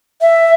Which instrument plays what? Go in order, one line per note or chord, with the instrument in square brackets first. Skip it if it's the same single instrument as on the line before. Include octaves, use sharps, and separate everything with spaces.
[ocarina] E5